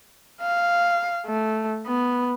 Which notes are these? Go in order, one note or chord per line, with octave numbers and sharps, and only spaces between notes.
F5
A3
B3